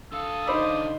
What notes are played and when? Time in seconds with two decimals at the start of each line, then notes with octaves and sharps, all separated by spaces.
0.13 D3 A4 F5 D#6
0.47 D#4 C5 D5 B5